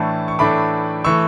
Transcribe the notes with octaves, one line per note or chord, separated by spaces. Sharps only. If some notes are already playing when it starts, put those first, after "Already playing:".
Already playing: A2 E3 A3 D4 A5 C#6
C#6
A2 E3 A3 D4 B5 D6
E3 A3 C#6 E6